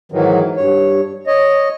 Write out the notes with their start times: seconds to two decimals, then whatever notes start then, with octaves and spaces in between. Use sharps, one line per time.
0.12 G#2 D#3 E3 F#3
0.56 G2 C#5
1.27 C#5 D#5